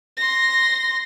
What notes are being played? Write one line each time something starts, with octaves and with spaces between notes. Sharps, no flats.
C6 A#6